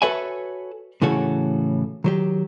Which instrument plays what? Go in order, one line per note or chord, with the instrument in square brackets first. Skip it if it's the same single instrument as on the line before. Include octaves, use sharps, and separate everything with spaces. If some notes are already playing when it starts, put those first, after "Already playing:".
[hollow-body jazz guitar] F#4 A4 B4 C#5 E5 G#5
A2 C#3 E3 F#4 A4 C#5
D#3 F#3 G4